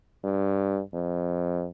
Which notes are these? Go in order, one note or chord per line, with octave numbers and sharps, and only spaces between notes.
G2
F2